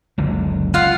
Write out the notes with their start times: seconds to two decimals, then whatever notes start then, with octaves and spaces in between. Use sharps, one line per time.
0.18 F#1 C#2 D3
0.74 F4 F5 F#5